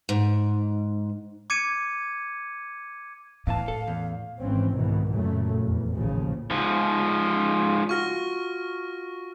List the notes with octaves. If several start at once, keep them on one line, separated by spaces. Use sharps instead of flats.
G#2
D6 G#6 C#7 D#7
E2 A2 E3 F5 A5
A4
E2
G#1 G#2 E3 C4 C#4
C2 G#2 B2 D#3 E3
F#2 A#2 C#3 F#3 A3
F1 E2
A1 D#2 C#3 F3
G#2 F3
F4 F#4 C#6 F6 A#6